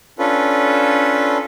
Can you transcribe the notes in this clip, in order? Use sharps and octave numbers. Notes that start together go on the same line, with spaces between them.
C#4 D4 F4 A4 B4